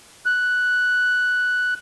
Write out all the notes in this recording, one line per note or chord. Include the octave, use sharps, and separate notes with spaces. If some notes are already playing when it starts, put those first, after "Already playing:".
F#6